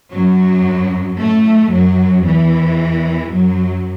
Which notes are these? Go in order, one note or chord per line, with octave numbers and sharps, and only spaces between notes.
F#2 F#3
A2 A3
F#2 F#3
E2 E3
F#2 F#3